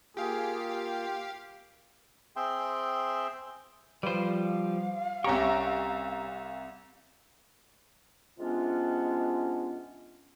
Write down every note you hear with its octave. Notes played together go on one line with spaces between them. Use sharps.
A#3 F4 G4 G#4 F5
G5
C4 G#4 E5 G5 C6
F3 G3 B4 C5 F5
C2 C#4 G4 E5 A#5 C#6
C3 G#3 B3 C#4 D4 F4